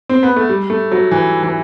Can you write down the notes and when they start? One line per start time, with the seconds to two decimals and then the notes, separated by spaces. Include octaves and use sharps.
0.09 C4
0.23 B3
0.36 A3
0.49 G3
0.70 A3
0.92 F#3
1.11 E3
1.43 E3